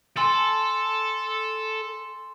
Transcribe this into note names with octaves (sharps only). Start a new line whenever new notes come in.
A4 G#5 C6 E6